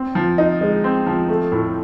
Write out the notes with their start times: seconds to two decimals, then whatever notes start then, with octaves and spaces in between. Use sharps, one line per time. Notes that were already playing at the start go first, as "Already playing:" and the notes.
Already playing: C4
0.15 F3
0.38 D#4
0.61 G#3
0.84 C4
1.07 F3
1.29 A3
1.52 A2